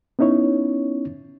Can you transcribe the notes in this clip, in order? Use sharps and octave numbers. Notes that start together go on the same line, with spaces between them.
B3 C#4 D#4 E4 C#5